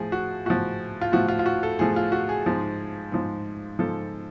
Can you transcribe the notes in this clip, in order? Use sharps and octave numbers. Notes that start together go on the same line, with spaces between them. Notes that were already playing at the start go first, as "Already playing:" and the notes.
Already playing: A2 F3 G#4
F#4
A2 F3 F#4
F4
A2 F3 F#4
F4
F4
F#4
A4
A2 F3 G#4
F4
F#4
G#4
G#2 F3
G#2 F3
G#2 F3 A4